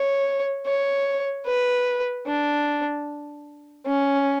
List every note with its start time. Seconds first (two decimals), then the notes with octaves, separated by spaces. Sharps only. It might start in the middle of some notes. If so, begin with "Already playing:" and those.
Already playing: C#5
0.66 C#5
1.46 B4
2.27 D4
3.87 C#4